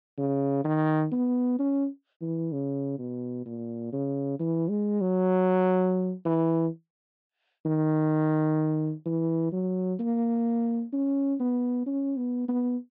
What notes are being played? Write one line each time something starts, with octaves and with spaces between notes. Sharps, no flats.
C#3
D#3
B3
C#4
E3
C#3
B2
A#2
C#3
E3
G#3
F#3
E3
D#3
E3
F#3
A#3
C#4
B3
C#4
B3
B3